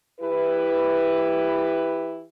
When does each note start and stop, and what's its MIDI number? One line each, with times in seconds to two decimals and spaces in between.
0.21 2.22 52
0.21 2.22 64
0.21 2.22 67
0.21 2.22 71